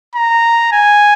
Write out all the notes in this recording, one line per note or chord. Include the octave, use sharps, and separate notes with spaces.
A#5
G#5